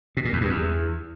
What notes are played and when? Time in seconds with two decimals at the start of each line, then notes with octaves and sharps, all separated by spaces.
0.17 B2
0.25 A#2
0.33 E2
0.41 G2
0.49 E2